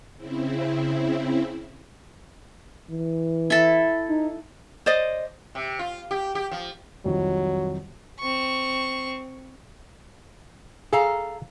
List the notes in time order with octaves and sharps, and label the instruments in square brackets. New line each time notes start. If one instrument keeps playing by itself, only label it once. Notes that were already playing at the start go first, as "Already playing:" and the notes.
[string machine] C#3 C4 E4
[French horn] E3
[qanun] E4 A4
[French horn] D#4
[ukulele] C5 D5 D#5
[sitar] C3
F4
G4
G4
F3
[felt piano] C2 F2 D#3 [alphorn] F#3
[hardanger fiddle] C4 C#6
[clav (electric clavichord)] G#4 [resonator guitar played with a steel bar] A4 F5 A#5